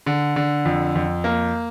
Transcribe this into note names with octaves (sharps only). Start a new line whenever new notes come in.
D3
D3
F2
F2
A#3